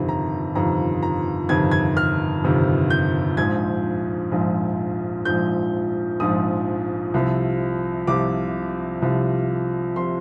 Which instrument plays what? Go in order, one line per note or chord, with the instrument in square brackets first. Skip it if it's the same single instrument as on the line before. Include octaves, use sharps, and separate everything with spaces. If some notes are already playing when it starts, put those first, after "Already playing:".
Already playing: [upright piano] G1 F2 C3 D#3
A#5
G1 F2 C3 D#3 A#5
A#5
G1 F2 C3 D#3 G#6
G#6
F6
G1 F2 C3 D#3
G6
A#1 G#2 F3 G#6
A#1 G#2 F3
A#1 G#2 F3 G6
A#1 G#2 F3 D#6
C2 C3 F3
C2 C3 F3 D6
C2 C3 F3
C3 F3 C6